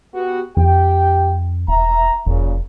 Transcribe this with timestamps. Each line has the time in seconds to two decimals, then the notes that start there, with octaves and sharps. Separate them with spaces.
0.14 B3 F#4 G4
0.57 F2 G4 G5
1.68 E1 E5 A#5
2.26 F1 A#2 C#3